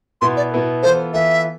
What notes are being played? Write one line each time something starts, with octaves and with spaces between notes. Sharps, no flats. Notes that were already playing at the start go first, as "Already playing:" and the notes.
B2 B3 E4 B4 C6
D5
B2 B3 E4 B4
E3 B3 F4 A4 C5
E3 B3 F4 A4 E5